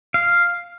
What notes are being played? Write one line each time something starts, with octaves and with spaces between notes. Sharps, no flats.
F5